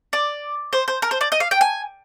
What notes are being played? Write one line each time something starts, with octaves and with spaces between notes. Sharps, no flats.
D5
C5
C5
A#4
C5
D5
D#5
F5
G5
G#5